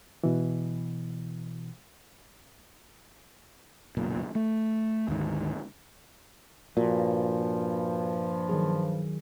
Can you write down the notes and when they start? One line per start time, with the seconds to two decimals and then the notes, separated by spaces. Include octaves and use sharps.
0.24 B2 E3
3.97 F#1 B1 A#2
4.35 A3
5.08 D2 G#2 D#3
6.77 G2 A#2 F3 F#4
8.49 D#3 F#3 G#4